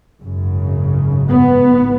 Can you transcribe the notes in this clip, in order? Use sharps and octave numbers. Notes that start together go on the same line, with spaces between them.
G#1 F#2 C#3
B3
A1 G#2